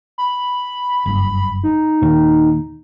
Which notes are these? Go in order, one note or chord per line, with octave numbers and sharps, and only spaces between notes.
B5
F#1 G2
D#4
D#2 A#2